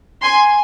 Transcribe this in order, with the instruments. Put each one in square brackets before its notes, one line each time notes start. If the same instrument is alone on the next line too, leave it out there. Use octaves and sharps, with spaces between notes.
[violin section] G#5 C6